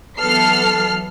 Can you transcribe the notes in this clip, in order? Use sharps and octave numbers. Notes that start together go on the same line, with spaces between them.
E3 F#3 B3 A4 F6 C7